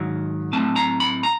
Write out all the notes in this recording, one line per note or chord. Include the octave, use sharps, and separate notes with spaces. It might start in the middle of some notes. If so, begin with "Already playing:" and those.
Already playing: G#2 D#3 F#3
A2 F#3 A3 C4 A5
A#5
B5
A#5